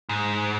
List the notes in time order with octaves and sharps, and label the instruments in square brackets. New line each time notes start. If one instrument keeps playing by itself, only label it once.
[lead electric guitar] G#2